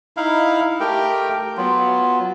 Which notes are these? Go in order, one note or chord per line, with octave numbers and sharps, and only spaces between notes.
D#4 E4 F5
A3 G4 A#4 G5
F#3 B3 F4